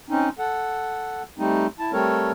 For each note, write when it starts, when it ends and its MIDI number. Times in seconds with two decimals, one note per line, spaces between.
0.10 0.29 60
0.10 0.29 61
0.10 0.29 63
0.39 1.22 69
0.39 1.22 78
1.38 1.67 55
1.38 1.67 57
1.38 1.67 60
1.38 1.67 63
1.79 1.92 64
1.79 1.92 81
1.93 2.32 55
1.93 2.32 57
1.93 2.32 60
1.93 2.32 69
1.93 2.32 70
1.93 2.32 73